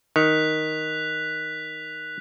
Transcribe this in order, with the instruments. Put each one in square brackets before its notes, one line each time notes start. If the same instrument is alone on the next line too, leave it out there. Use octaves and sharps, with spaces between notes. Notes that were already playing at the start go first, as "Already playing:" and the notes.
[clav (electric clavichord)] D#3 [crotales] F#6 B6 F7